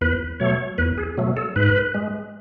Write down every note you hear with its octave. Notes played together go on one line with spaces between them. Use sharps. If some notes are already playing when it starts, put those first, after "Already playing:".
E2 B4
B2 F#3 A3 C#5
E2 B4
G#4
B2 F#3 A3
A4
G#2 B4
G#3